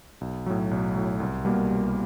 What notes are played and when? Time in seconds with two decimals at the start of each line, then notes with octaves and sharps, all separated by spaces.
0.21 B1
0.46 A2 F#3
0.71 B1
0.96 A2 F#3
1.20 C2
1.45 B2 G3 A#3
1.71 C2